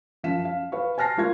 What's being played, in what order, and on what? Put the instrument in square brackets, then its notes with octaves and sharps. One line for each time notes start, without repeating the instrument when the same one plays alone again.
[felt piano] F#2 F3 F5 B6 E7
F5
B4 F5 C#6
C5 G#5 A5 F6 A#6 C7
G3 A#3 F4 F5 C#6 G#6